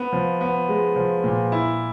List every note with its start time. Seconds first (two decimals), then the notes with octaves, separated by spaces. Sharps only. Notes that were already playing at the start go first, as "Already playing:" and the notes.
Already playing: B3
0.13 F3
0.41 B3
0.69 G#3
0.96 F3
1.24 A#2
1.52 E4